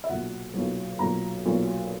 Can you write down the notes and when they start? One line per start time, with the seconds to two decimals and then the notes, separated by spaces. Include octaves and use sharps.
0.04 E5
0.09 B1 A#2 F#3 F#5
0.54 B1 A#2 F#3
0.99 B1 A#2 F#3 A#5
1.45 B1 A#2 F#3